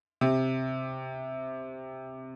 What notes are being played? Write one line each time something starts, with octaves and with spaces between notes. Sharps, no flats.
C3